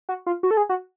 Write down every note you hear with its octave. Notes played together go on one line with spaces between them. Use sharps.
F#4
F4
F#4
A4
G#4
F#4